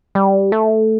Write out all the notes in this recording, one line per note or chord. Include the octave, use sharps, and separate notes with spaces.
G3
A3